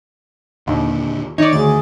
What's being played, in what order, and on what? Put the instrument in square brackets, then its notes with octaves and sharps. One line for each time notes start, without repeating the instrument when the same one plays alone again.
[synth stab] D#2 [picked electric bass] A#2 D3
[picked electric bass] D#3 [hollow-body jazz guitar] D#4 [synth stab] C#5 D5
[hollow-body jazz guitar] D2 [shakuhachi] G#4 [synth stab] A6